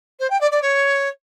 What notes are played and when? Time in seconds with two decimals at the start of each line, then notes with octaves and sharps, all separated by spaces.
0.20 C5
0.30 G5
0.41 D5
0.51 D5
0.62 C#5